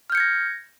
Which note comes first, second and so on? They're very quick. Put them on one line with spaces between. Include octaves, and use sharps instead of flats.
F6 G6 C#7 G#6 A#6